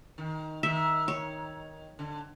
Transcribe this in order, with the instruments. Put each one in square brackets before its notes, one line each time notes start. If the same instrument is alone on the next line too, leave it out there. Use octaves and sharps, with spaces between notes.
[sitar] D#3
[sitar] D#3 [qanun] E5
[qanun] C#5
[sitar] D3